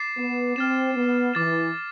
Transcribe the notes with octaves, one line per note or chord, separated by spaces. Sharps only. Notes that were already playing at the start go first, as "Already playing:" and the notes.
Already playing: D6 A6 C7 E7
B3
C4 F6 A6 E7
B3
E3 D6 A6 E7